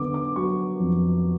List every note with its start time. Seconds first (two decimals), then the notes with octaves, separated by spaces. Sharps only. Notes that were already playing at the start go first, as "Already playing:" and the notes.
Already playing: D3 B3 D6
0.14 D6
0.36 F#3 C#6
0.80 F2